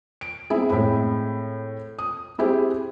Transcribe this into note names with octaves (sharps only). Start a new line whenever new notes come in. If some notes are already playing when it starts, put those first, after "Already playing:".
D7
B3 C4 E4 G#4
A2 G#3 C4 B5
D#6
C4 E4 G4 G#4 C5